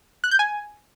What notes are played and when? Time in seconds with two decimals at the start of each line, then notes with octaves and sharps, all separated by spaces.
0.24 F#6
0.31 G6
0.39 G#5